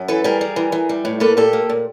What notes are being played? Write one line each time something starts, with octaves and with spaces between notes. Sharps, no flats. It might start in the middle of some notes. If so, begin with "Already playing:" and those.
Already playing: F#2
E3 A4 B4
G3 G#4 A#4
G3
E3
E3
G3
A2
A#3 A4 B4
A#2 G4 A4
A#3
A#2